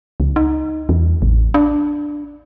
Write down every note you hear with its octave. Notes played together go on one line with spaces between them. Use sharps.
C#2
D#4
E2
A1
D4